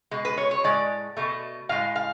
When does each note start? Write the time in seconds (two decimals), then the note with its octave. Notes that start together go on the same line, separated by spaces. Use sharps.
0.11 B2 G#3
0.25 B4
0.38 C#5
0.51 C#5
0.64 A2 G#3 D5
1.17 B2 A3
1.69 A2 G#3 F5
1.96 F5